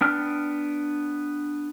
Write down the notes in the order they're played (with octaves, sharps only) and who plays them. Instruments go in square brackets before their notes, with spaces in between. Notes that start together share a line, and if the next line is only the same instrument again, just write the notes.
[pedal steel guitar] B3 D4 G5 F6